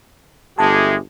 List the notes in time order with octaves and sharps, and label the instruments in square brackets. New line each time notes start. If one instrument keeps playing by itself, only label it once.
[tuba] G1 [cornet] G#3 [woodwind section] A3 G4 G#4 [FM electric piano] A5